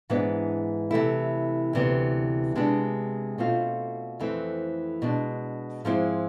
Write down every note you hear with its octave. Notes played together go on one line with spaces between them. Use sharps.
G#2 E3 B3 D4
C3 E3 A3 E4
D2 C3 E3 B3
C3 G#3 B3 D4
B2 A3 C4 F4
F2 E3 A3 C4
B2 G#3 D4
G#2 F3 G#3 C4 E4